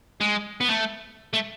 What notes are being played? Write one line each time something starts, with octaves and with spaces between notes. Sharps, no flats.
G#3
B3
A3
A3